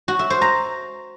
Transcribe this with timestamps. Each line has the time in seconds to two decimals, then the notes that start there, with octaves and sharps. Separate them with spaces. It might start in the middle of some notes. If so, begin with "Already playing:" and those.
0.08 F#4
0.19 E5
0.30 C5
0.41 A#5